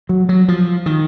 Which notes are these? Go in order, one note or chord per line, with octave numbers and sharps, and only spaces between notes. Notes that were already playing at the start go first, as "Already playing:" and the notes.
F#3
F#3
F3
D#3